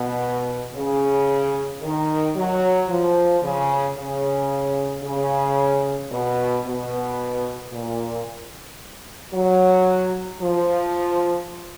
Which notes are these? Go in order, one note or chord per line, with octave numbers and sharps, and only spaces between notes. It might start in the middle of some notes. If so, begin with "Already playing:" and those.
Already playing: B2
C#3
D#3
F#3
F3
C#3
C#3
C#3
B2
B2
A#2
F#3
F3